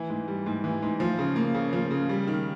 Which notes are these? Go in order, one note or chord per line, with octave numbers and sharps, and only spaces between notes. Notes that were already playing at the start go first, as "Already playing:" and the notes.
Already playing: E3
G#2
G3
G#2
E3
G#2
F3
C#3
A#3
C#3
F3
C#3
G3
D#3